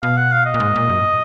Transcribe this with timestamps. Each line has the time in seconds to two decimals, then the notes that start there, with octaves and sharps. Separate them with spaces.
0.03 B2 F5
0.17 F#5
0.32 F5
0.46 D#5
0.54 A#2
0.60 G#2
0.76 A#2
0.90 F#2